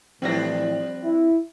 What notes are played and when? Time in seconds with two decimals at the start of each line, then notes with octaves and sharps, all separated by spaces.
0.22 A2 E3 F3 G3 C4 D4 A#6
1.04 E4